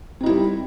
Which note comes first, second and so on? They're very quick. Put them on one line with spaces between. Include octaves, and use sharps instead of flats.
C4 D#4 E4 G3